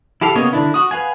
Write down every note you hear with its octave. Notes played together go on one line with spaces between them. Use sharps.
E4 G4 A4 F5
C#3 A#3 B3 C#5 D#5
D3 D4 E4
F#4 D#6
B4 F5 F#5 G#5